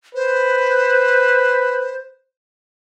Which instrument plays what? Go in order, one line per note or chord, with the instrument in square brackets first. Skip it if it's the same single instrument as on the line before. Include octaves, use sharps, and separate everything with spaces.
[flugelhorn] B4 [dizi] C5